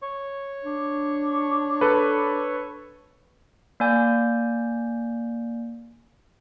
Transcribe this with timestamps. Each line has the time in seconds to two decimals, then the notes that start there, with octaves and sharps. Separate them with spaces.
0.02 C#5 C#6
0.64 D4
1.81 A4 B4
3.80 A#3 D5 G#5 G6